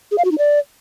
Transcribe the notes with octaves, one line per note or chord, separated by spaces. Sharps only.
G#4
F5
F#4
D#4
D5